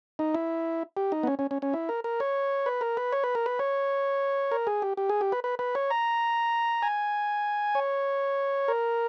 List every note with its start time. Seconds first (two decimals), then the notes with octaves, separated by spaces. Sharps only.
0.19 D#4
0.35 E4
0.97 G4
1.12 D#4
1.23 B3
1.27 C#4
1.39 C#4
1.51 C#4
1.62 C#4
1.74 E4
1.89 A#4
2.04 A#4
2.20 C#5
2.66 B4
2.81 A#4
2.97 B4
3.12 C#5
3.24 B4
3.35 A#4
3.46 B4
3.59 C#5
4.51 A#4
4.67 G#4
4.82 G4
4.97 G4
5.09 G#4
5.21 G4
5.32 B4
5.44 B4
5.59 B4
5.75 C#5
5.90 A#5
6.82 G#5
7.75 C#5
8.68 A#4